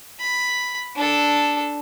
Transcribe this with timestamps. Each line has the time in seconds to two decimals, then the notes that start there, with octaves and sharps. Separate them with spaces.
0.20 B5
0.96 D4 A4